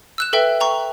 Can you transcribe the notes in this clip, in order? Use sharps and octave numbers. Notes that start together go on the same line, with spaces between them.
E6 F#6 E7
A4 B4 E5 G5
G5 A#5 C#6